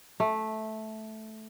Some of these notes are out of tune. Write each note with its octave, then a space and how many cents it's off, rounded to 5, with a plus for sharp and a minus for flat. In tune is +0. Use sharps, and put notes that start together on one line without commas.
A3 -10